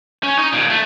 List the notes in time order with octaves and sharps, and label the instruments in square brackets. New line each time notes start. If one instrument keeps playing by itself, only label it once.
[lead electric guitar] C#4
D#4
D#2 A#2
A3